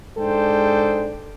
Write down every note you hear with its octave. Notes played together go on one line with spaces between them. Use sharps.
G#2 G#3 D4 A4 C5 G5